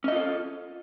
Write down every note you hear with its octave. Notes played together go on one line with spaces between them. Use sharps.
C#4 F4 A4 D#5